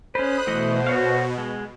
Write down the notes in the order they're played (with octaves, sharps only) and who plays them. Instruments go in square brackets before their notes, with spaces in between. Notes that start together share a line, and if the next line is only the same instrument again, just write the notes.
[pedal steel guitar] C#4 B4 [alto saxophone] C5 [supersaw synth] B5 D#6 F#6
[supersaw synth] B2 [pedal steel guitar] E3 A3 D#5
[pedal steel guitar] F#4 C#5 F5
G#3